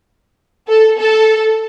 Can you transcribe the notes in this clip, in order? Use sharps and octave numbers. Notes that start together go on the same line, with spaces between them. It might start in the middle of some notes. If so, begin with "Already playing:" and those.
A4
A4